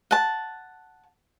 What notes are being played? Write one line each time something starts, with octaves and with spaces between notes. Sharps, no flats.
F#5 A5